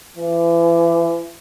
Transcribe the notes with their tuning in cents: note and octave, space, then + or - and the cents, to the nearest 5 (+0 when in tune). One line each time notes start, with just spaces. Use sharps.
E3 +35